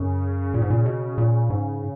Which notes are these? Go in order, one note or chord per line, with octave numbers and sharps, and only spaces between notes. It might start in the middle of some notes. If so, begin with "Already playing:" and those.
Already playing: F#2 C#3
A#2 C#3
G#2
A#2
B2
A#2
G#2